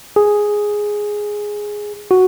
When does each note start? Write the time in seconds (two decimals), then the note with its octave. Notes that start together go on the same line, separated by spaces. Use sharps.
0.16 G#4
2.11 F#4